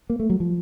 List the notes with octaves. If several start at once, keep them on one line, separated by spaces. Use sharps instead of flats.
A#3
A3
F#3
F3